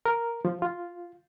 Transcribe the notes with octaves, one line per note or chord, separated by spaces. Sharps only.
A#4
F3
F4